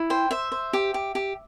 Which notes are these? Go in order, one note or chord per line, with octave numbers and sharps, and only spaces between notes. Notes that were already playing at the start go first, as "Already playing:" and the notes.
Already playing: E4
C5 G5
C5 E5
C5
G4
G4
G4